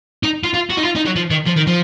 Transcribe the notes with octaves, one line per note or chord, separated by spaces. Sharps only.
D#4
F4
F4
F#4
D#4
F4
D#4
F#3
F3
D#3
F3
D#3
F3